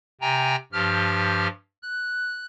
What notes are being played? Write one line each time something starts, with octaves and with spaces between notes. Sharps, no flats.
C3 G5 G#5 A#5
G2 F3 G4 F6
F#6